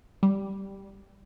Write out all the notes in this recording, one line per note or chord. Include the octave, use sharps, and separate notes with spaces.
G3